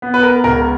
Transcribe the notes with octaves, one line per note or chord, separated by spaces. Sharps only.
B3
B4
A#4
C#2 A#4